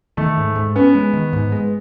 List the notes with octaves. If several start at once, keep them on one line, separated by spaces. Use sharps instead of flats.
D#3 A3
G#2
G#2
B3 C#4
G#3
D#3
G#2
G#3